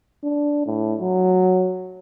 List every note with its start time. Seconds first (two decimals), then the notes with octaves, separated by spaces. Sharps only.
0.24 D4
0.66 A2
1.01 F#3